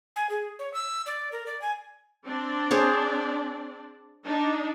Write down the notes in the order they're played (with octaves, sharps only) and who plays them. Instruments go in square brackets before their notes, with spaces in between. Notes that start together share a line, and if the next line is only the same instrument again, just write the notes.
[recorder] G#5
G#4
C#5
E6
D5
A#4
D5
G#5
[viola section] C4 D4 D5
[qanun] G#4 C5 C#5
[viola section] D4 D#4